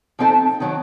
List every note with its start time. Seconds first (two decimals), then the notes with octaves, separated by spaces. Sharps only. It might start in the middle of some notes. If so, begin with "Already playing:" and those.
0.19 F3 C4 D#4 A4
0.60 D#3 F#3 C4